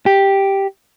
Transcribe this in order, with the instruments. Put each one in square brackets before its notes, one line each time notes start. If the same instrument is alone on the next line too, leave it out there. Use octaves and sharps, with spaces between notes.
[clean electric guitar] G4